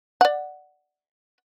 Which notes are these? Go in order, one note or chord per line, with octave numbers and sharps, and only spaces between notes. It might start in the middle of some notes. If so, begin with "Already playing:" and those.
D5 F#5